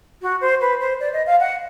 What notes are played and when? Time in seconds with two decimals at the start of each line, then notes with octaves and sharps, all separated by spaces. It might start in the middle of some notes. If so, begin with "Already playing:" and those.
0.22 F#4
0.41 C5
0.61 B4
0.80 C5
1.00 D5
1.13 D#5
1.27 F5
1.40 F#5